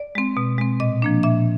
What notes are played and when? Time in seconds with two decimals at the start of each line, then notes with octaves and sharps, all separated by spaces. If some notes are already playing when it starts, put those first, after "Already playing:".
Already playing: D5
0.15 G#3 C4
0.37 B2
0.58 G#3 C4
0.80 A#2 D#5
1.02 F3 A#3 D4
1.23 A#2 E5